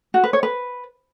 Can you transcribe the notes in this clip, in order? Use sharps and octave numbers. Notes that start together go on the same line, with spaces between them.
F#4
B4
C#5
B4